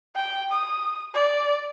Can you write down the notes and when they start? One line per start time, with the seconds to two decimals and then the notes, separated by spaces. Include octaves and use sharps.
0.16 G5
0.52 D#6
1.14 D5